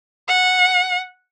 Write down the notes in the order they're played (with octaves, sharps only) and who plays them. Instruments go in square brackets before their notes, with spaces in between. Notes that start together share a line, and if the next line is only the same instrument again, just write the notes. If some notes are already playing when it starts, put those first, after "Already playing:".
[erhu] F#5